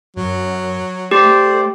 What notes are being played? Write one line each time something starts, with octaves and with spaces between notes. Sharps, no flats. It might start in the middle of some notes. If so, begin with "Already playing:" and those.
F#2 F#3
A3 G4 C5 D5